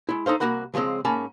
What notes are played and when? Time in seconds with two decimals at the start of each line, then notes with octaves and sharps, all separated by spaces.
0.09 G#3 E4
0.26 D#4 A4 C5 F5
0.40 C2 F3 A#3 F#4 F#5 B5
0.74 C#3 F3 F#3 G#3 C4
1.05 G#2 A#3 C#4 A5 B5